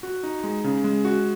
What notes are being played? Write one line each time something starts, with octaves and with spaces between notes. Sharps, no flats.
F#4
D#4
G#3
C#3
G#3
F#4